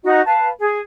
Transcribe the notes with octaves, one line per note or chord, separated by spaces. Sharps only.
D#4 F#4 D#5
B4 F5 A5
G#4